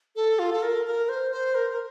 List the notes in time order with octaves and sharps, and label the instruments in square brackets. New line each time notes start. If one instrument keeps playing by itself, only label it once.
[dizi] A4
F4
A4
A#4
A#4
C5
C5
A#4
A#4